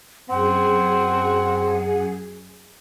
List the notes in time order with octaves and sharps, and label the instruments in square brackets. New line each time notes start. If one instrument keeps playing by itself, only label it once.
[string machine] F#2 G#4 [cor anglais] C4 [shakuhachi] F#5